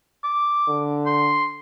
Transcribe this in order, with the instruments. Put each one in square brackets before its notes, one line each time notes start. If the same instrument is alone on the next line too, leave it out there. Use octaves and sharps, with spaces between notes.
[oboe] D6
[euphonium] D3
[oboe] C6